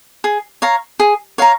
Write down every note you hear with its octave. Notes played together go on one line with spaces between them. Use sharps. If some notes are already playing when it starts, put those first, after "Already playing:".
G#4
C#5 F5 A#5
G#4
C#5 F5 A#5